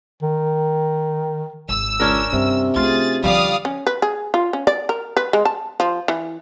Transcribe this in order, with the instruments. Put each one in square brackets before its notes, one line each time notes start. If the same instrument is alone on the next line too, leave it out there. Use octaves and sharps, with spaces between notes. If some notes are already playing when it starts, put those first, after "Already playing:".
[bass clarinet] D#3
[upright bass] G#1 [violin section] E6
[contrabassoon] C#2 [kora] C#4 D4 A#4
[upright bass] G2 [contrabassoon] C3
[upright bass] A3 C#4 [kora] F4 [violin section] G#4 A6
[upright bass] D3 F3 [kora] G3 [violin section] D5 F5 D#6
[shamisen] C#4
B4
G#4
F4
C#4
D5
A#4
B4
G#3
A5
F3
E3